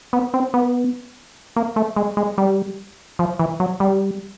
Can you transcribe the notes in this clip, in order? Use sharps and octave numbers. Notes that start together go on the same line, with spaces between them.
B3
C4
B3
A#3
A3
G#3
G#3
G3
F3
E3
F#3
G3